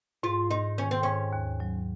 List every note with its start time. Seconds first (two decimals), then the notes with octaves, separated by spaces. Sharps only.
0.23 G#2 F4
0.51 G#2 D#4
0.78 D#3 C#4
0.91 C4
1.03 G#2 C#4
1.33 D#2
1.60 F#3